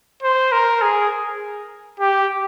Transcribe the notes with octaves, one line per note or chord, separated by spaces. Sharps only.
C5
A#4
G#4
G4